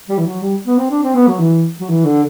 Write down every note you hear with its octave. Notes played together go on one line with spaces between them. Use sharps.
G3
E3
F#3
G3
B3
C4
D4
C4
B3
F#3
E3
F#3
E3
D3